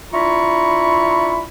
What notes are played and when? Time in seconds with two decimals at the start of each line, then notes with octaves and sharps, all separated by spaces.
0.13 D4 E4 F4 A#5 B5 C#6